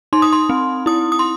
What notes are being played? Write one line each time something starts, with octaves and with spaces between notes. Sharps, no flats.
D#4 C6
D#6
C6
C4
E4 D#6
D#6
C6